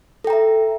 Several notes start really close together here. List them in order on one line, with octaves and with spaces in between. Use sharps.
A4 G5 A#5 E5